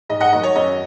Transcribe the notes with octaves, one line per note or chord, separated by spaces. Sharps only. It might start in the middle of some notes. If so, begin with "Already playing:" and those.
G#2 D#5
D#5 F#5
D#3 F#3 D#5
C#5
F#2 D#5